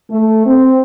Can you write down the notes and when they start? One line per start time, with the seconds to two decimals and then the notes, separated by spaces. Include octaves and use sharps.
0.11 A3
0.46 C4